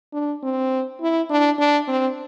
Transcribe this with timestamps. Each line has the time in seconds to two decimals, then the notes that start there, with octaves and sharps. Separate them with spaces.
0.13 D4
0.43 C4
1.01 E4
1.30 D4
1.59 D4
1.87 C4